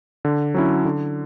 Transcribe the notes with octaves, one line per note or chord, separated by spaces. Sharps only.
D3
F#3 C#4 E4
D3